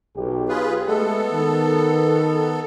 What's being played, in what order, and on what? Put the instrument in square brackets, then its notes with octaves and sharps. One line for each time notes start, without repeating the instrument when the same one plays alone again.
[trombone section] B1 G4
[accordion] F4 G#4 B4
[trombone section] G#3 A3 [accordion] B3 A4
[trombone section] D#3